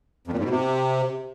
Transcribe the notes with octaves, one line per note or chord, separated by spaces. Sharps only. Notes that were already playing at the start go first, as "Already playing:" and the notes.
F2
A#2
G#2
B2
C3